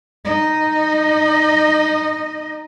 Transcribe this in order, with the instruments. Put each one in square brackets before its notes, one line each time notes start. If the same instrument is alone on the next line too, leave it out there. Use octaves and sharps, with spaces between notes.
[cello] D#4 D#5